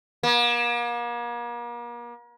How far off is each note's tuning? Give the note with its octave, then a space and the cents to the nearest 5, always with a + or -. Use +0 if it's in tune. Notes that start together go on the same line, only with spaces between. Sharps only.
A#3 +40